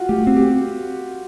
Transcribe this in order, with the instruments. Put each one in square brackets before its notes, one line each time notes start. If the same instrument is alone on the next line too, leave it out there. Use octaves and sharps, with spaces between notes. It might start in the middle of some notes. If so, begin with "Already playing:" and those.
Already playing: [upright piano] F4 F#4
[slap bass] A3 [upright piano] G4
[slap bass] C4
[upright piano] G4